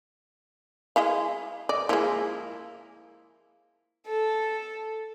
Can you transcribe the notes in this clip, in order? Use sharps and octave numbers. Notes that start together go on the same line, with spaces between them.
G#3 E4 F5
D5 D#5 D6
F3 G#3 A#3 E4
A4